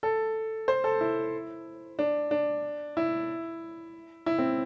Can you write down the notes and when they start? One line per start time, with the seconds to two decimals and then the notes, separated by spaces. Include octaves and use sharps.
0.03 A4
0.68 C5
0.84 A4
1.01 E4
1.99 D4
2.31 D4
2.97 E4
4.26 E4
4.38 C4